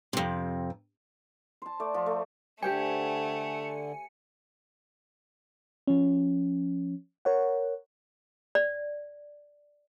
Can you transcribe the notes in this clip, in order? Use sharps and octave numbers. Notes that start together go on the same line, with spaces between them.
F2 C3
C5 A5
A3 D5
F3
A3
D3 A3 G4 C5 G5 G#5 C#7
F3 C#4
A#4 C#5 F#5
D5